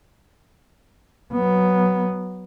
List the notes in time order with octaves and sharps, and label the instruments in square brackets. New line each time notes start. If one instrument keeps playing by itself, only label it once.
[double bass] F#3 B3